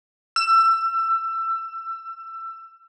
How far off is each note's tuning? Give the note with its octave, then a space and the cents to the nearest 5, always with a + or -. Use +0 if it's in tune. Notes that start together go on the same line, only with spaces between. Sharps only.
E6 +25